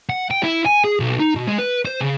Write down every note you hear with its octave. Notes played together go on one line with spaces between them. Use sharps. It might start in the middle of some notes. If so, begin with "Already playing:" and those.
F#5
G5
E4
G#5
G#4
B1
D#4
B2
G#3
B4
C5
C#3